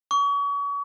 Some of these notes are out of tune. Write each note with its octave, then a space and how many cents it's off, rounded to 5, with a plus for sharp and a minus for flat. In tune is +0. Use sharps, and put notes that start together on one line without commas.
C#6 +35